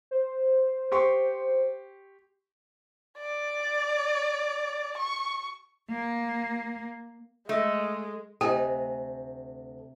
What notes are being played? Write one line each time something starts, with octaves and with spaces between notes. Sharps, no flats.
C5
G4 C6 C#6
D5
C#6
A#3
G#3 A3 D#5
D2 C3 G4 D#5 G#5